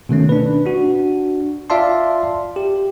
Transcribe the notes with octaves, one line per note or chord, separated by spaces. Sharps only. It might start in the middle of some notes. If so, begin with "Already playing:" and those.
B2 D#3 A3 C#4
D4 B4
D4 F#4
F4 D5 E5 F5 A5 C6
G4